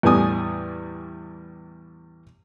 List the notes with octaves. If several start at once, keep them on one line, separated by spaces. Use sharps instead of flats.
E2 A2 E3 G3 G#5 D#6